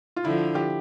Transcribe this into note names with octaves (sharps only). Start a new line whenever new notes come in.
F4
D3 F3 E4
G4